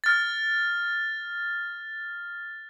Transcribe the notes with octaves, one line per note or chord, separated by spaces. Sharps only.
F6 A6